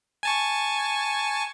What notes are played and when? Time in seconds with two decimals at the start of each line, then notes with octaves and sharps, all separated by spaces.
0.23 G#5 A5 C#6